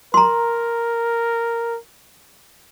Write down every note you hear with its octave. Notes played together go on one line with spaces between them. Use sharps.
A#4 A#5 C6